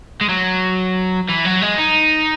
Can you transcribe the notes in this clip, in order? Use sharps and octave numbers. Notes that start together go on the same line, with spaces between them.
G#3
F#3
E3
F#3
G#3
D#4